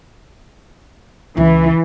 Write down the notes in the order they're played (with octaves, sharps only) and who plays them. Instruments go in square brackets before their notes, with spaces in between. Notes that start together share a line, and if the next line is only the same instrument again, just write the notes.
[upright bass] C#2 C#3 [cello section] E3